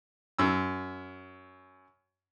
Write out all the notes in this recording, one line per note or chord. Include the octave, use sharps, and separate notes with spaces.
F#2 E6